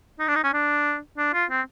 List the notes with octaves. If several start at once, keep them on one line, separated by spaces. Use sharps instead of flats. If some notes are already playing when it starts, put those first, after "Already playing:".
D#4
D4
D#4
C#4
D4
D4
F4
C4